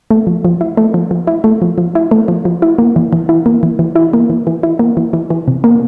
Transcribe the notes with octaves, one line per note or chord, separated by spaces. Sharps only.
A3
F3
F3
E4
A3
F3
F3
E4
A3
F3
F3
E4
A3
F3
F3
E4
A#3
E3
E3
E4
A#3
E3
E3
E4
A#3
E3
E3
E4
A#3
E3
E3
E3
C3
A#3